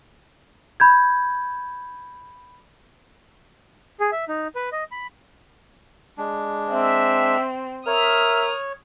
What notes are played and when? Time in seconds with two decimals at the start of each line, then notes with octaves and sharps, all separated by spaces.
0.80 B5 G6 G#6
4.00 G#4
4.12 E5
4.28 D#4
4.55 B4
4.72 D#5
4.92 B5
6.18 G#3 D4
6.70 C4 E5
7.87 A#4 C#5 E5 D#6 F6